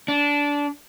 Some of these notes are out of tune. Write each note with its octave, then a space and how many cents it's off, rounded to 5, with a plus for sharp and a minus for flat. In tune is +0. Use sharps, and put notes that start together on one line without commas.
D4 -20